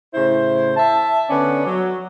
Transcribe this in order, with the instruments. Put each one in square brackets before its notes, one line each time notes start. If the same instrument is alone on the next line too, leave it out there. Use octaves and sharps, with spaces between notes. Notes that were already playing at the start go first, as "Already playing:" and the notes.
[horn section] A2 C#3 E4 C5
E5 A5
D3 B3 C#4 D5
F#3